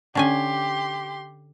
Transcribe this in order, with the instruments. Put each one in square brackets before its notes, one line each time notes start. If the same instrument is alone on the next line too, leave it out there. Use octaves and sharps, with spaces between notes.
[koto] D3 C#4 G#5 [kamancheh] G4 C6